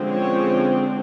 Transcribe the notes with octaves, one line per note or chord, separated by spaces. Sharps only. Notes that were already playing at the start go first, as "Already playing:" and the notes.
Already playing: D3 F3 G#3 C4
C#4 C#5